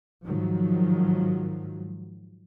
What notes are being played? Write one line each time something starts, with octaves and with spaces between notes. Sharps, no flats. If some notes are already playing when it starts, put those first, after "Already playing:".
G#2 D#3 F3 F#3